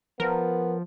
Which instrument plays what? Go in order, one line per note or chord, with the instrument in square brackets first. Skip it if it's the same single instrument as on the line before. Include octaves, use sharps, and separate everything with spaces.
[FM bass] F3 [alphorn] B3 [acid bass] A#4